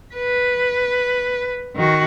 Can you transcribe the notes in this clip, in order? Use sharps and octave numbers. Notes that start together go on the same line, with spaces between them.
B4
D#3 F#4